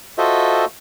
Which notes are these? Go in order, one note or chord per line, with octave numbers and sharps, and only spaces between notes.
F4 F#4 A4 C5 D#5 E5